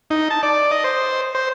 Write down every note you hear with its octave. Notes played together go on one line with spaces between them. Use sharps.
D#4
A5
D5
D#5
C5
C5